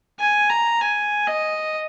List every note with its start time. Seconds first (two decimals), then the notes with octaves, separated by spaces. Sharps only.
0.20 G#5
0.50 A#5
0.81 G#5
1.27 D#5